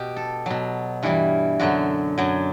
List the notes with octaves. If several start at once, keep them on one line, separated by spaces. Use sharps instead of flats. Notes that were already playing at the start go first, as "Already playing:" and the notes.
Already playing: B2 G4
A4
B2 F#3
G2 E3 G3
F#2 D3 F#3 F#4
F#2 F#3